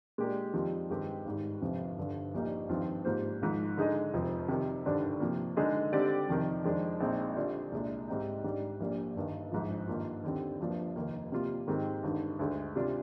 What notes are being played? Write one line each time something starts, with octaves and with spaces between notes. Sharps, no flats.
A#2 G#3 D4 G4 A#4
F2 D#3 G3 C4 F4
G2 D#3 G#3 C4 G4
G#1 G#2 G3
G1 F2 C3
G1 G2 D3
A#1 A#2 G3 A#3 D#4
G#1 G2 F3 C4 F4
G#2 G3 A#3 F4 C5
G#1 G#2 F3
D3 G#3 D#4 G#4 D#5
F1 F2 C3 F3
C3 D#3 G3
G#1 G2 D3 G3 D4
C3 F3 A#3
D3 G#3 D#4 G#4 D#5
D3 G3 C4 G4 D5
F2 C3 D#3
F2 D#3 G#3 D4
A#1 A#2 G#3 C4 D#4
D3 G3 D4 F4
C2 A#2 G#3 D4
G#2 G3 C4 D#4
G#2 G3 D4
A#1 A#2 G3 A#3 D4
G1 G2 D#3
A#1 G#2 F3
G2 D#3 A#3 F4
D#2 D3 G3 C4
G1 G2 F3 A#3 D4
F1 D#2 D#3 A#3
C3 G3 A#3 F4
G#2 D#3 G#3 C4 G4
G#1 G2 D3
D2 D3 G#3
C3 G3 D4 F4